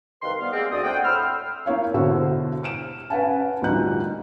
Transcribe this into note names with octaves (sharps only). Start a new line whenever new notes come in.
C2 D#3 B4 F5 C6
G3 B3 F5
G#3 A#3 C4
D2 D5 D#6
A3 C4 F#5 G5
A2 B5 C6 E6 F6
A#3 E4 C#5 F5
B2 D3 E4 F#4 C5 E6
F6 D7 E7
C#4 B4 F5 F#5 G#5 A5
D2 A#2 G3 D#4 F#6